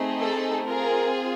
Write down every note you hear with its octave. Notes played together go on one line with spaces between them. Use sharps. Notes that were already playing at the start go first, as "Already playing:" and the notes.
Already playing: A3 C4 D#4 G#4
A4
C4 F4 G#4 A#4